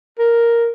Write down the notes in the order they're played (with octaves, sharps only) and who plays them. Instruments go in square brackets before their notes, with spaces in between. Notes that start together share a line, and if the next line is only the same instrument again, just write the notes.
[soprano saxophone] A#4